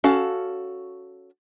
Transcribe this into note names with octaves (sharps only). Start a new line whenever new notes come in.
C#4 F#4 A4 F5